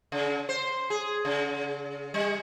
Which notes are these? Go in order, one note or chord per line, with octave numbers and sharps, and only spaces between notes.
C#3
C5
G#4
C#3
G3